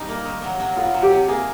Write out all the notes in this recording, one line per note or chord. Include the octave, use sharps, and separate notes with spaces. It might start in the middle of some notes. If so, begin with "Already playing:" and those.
Already playing: G3 D#4
A#3
D#3
F#3
F#3
B3 F4
F#3
G4
C3
A#3 G#4